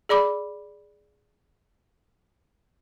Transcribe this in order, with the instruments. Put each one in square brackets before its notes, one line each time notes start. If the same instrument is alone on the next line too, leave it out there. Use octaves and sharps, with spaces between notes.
[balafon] G#4 D5 B5 D6